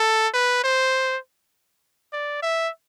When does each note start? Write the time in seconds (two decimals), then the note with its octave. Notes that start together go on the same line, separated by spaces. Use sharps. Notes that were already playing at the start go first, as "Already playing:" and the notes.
Already playing: A4
0.34 B4
0.64 C5
2.13 D5
2.43 E5